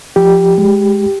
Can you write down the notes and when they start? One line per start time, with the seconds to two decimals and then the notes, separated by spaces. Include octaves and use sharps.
0.16 F3 G4
0.58 G#3